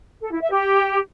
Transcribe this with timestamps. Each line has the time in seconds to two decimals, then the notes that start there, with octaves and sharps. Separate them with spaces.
0.21 A4
0.31 E4
0.41 E5
0.51 G4